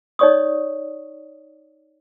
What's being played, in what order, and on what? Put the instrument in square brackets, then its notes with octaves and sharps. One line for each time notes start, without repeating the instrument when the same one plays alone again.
[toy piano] D#4 C#5 D5 C#6 D#6